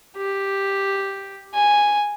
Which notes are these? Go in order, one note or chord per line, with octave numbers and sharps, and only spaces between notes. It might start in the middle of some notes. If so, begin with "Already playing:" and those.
G4
G#5